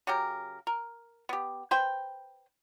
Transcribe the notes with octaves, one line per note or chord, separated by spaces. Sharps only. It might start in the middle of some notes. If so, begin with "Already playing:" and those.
C#3 F#3 G4 A#4
A#4
B3 G4
B4 C5 G5